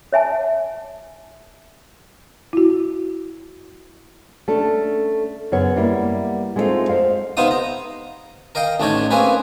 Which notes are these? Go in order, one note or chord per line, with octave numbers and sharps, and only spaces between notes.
C#5 E5 G#5 A5
E4 F#4
A3 C#4 D4 A4
F#2 C#3 B3 C#5
G3 A#3 B3 E4
G#3 A3 C4 C#4 D#4 F4
C5 C#5 D#5 F5
C3 B3 C4 D#4 F5 D#6
A#5
A#4 D#5 F5 G5
A1 A3 D4 D#4 C#5 D#5
A#3 C4 C#4 G#4 B4